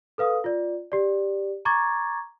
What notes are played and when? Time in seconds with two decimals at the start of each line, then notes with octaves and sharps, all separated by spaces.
0.18 A4 B4 F5 D#6
0.44 F4 D5
0.92 G4 D5
1.65 A#5 C#6 D6 G#6 A6